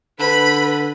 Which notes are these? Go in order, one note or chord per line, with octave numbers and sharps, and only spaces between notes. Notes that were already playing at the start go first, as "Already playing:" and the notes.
D3 B4 B5